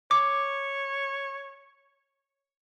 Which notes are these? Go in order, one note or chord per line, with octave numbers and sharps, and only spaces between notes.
C#5 D6